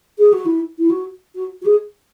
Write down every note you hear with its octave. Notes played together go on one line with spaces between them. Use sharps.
G#4
F#4
E4
E4
F#4
F#4
F#4
G#4